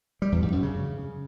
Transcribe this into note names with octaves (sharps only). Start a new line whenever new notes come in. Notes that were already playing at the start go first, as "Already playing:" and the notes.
G3
E2
G#2
F#2
C#3